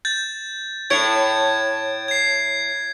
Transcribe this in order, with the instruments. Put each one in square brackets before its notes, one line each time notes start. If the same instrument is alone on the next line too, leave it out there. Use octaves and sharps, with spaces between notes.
[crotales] G6 A6
[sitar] A2 C#5 [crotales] G#6 D7
[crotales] G#6 C7